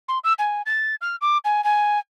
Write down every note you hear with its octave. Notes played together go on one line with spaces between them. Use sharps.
C6
E6
G#5
A6
F6
D6
G#5
G#5